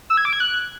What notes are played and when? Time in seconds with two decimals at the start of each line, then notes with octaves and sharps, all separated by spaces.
0.10 E6
0.17 G#6
0.25 D6
0.33 G#6
0.40 F#6